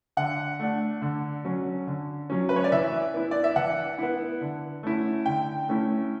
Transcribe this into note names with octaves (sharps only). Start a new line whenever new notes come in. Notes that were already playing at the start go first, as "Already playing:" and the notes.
D3 F#5
A3 D4
D3
F#3 C#4
D3
F#3 C#4
B4
C#5
D5
E3 E5
B3 E4
D5
E5
E3 F#5
B3 E4
D3
A3 C#4 E4
D3 G5
A3 C#4 E4